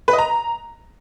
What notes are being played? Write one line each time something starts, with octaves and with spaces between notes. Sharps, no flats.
B4
D#5
A#5